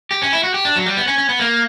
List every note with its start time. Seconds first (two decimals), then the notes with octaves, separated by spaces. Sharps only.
0.11 G4
0.22 C#4
0.33 E4
0.43 F#4
0.54 G4
0.65 D4
0.76 F#3
0.86 G3
0.97 B3
1.08 C#4
1.18 C#4
1.29 B3
1.40 A#3